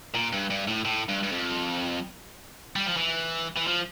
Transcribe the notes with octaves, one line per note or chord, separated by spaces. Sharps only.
A#2
G2
G2
A2
A2
G2
G2
F2
G3
F3
E3
E3
F3